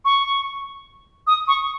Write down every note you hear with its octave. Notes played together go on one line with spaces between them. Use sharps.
C#6
D#6
C#6